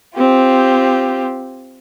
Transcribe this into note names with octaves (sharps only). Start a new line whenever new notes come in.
C4 F4 G4